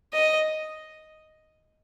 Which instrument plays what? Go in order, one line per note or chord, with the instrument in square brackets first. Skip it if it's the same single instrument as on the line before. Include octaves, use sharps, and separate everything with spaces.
[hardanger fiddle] D#5